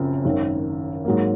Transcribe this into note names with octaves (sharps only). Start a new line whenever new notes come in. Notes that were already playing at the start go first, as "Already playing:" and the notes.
Already playing: F#1 F#2 F3 C4
G#1 F#2 D#3
G#2 F#3 A#3